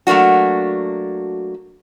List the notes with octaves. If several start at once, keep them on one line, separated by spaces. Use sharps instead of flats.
F#3 A3 A#3 D4 F#4